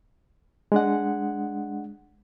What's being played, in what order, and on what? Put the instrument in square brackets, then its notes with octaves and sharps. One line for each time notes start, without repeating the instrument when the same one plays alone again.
[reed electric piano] G#3 D4 F#5